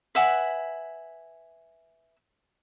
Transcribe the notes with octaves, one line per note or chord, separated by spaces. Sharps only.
B4 E5 F#5 G#5